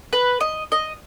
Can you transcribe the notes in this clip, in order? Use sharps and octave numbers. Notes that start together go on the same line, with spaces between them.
B4
D#5
D#5